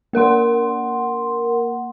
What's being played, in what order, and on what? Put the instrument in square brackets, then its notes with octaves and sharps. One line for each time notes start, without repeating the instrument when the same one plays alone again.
[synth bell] A#3 A#4 F#5 C6